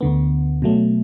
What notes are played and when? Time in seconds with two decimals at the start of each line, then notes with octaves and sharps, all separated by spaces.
0.01 D2 D3 B3
0.62 B2 F#3 A3